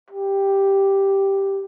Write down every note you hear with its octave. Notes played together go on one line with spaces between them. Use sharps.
G4